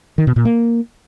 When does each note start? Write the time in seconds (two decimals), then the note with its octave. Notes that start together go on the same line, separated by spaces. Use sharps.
0.18 D#3
0.27 B2
0.36 A#2
0.45 A#3